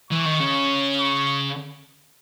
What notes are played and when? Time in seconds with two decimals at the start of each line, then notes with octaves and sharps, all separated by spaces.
0.11 E3 C#6
0.26 D#3
0.40 C#3
1.00 C#6